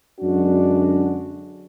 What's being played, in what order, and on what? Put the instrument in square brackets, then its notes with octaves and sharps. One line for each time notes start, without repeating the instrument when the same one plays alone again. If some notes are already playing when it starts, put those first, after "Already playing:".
[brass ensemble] F#2 D3 G#3 D4 F#4